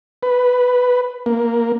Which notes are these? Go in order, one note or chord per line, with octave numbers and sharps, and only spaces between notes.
B4
A#3